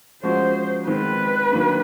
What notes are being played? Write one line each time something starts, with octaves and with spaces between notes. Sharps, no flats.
F3 G#3 C#4 F#4 C5
D#3 G#3 C4 B4
D#3 F#3 A#3 D4